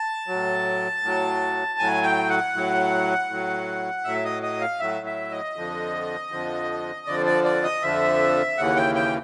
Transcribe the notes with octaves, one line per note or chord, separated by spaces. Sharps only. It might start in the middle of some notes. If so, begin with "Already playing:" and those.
Already playing: A5
A2 F#3
A2 F#3
A2 F#3 G#5
G5
F#5
A2 F#3
A2 F#3
A2 F#3 E5
D#5
D#5
F5
A2 F#3 E5
E5
D#5
F2 D3 F3
F2 D3 F3
F2 D3 F3 D5
D5
D5
D#5
F2 D3 F3 E5
D#2 C#3 E3 F#5
G5
G5